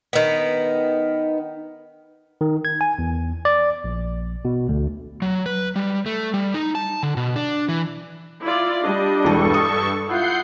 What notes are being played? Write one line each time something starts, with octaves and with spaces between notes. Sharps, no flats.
D#3 B3
D#3
G#6
G#5
E2
D5
A#1
B2
D2
F#3
B4
G3
A3
G3
D#4
A5
D3
B2
D4
E3
E4 F4 D5
G3 D4 D#5
E1 G2 E3 A4 A5 C#6
D#6
E4 F4 F#5 G6 C7